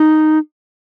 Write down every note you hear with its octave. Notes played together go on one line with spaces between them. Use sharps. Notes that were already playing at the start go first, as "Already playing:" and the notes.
Already playing: D#4